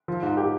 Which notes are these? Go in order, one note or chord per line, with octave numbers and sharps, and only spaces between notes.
F3
G#2
G4